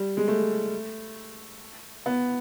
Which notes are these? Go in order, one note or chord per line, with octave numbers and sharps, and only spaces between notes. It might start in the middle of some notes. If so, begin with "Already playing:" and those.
Already playing: G3
G#3
A3
B3